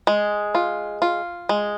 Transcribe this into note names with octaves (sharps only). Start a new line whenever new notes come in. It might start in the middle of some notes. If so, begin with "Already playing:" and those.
G#3
F4
F4
G#3